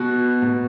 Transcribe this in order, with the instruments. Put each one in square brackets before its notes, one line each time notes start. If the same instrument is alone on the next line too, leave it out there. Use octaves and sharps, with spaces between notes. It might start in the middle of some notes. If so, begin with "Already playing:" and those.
Already playing: [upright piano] B2 F#4
B2